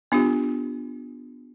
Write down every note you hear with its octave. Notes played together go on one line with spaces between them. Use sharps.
B3 D4 F4 G4